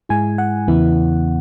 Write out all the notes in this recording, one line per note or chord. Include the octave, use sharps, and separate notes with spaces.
G#2 G#3 E4 G#5
F#5
E2 C#3 E3 B3 E4